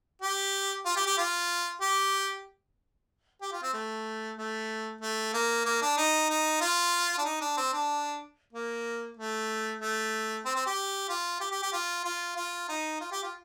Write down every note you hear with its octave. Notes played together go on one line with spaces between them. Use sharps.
G4
F4
G4
G4
F4
G4
G4
F4
C4
A3
A3
A3
A#3
A#3
D4
D#4
D#4
F4
D4
D#4
D4
C4
D4
A#3
A3
A3
C4
C4
G4
F4
G4
G4
G4
F4
F4
F4
D#4
F4
G4
F4